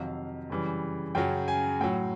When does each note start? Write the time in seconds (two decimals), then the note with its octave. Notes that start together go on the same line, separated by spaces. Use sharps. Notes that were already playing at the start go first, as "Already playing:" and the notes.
Already playing: F2 C3 D#3 F#3 F5
0.50 F#2 C#3 E3 G3
1.15 F#2 C#3 F#3 G5
1.48 G#5
1.80 A2 G5
1.84 F#3